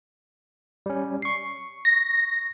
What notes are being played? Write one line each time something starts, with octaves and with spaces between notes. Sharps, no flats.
G3 C#4
C#6 C7
A#6